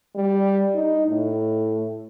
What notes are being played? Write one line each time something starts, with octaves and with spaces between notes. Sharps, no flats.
G3
D#4
A2